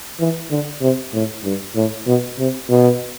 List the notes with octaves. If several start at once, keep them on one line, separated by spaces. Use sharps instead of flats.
E3
D3
C3
A2
G2
A2
B2
C3
B2